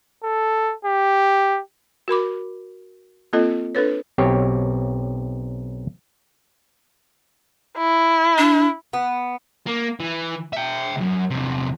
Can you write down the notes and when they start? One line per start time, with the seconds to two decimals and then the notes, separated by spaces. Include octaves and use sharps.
0.24 A4
0.85 G4
2.08 F#4 A#4 B5 D6
3.33 A#3 C4 F4 A4 D#5
3.75 D4 A4 B4 C#5
4.18 B1 C4 G4 C#5
7.78 E4
8.38 D4
8.93 B3
9.67 A#3
10.00 E3
10.53 E5 G5
10.96 C#2 F#2
11.30 E2 C3